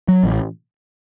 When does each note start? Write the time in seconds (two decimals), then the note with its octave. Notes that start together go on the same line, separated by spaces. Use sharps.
0.08 F#3
0.23 A1